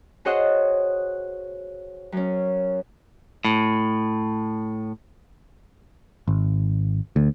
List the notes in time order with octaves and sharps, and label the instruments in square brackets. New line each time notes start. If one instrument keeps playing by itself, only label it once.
[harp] F#4 G#4 C5 C#5 D#5 F#5
F#2 C#4
[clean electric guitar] A2
[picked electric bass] G#1
D2